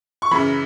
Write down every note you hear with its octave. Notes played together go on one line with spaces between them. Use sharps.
C#6
F#2 C#3 E3 B5